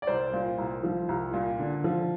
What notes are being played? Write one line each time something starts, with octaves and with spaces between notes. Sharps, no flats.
D5
C2 C5
A#2
C2
F3
C2
A#2
D3
F3